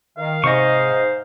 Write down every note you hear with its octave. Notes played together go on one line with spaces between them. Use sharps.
D#3 F5
G#2 C3 C5 D#5 C#6